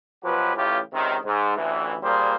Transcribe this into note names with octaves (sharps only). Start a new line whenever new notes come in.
B2 F3 F#3 G4 B4
A1 A2 C#3 F4 G4
C#2 C3 D#3
G#2
A1 D2 E3
A#2 G3 A#3 G#4 C5